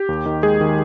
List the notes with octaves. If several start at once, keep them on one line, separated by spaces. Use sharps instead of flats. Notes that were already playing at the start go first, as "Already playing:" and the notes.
Already playing: G4
D#2
D#3
G#3 G#4
D#3